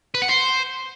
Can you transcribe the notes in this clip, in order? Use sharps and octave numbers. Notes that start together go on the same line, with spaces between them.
B4
F#5
C5